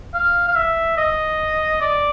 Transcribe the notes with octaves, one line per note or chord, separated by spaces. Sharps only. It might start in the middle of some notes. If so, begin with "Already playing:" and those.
F5
F5
E5
D#5
D5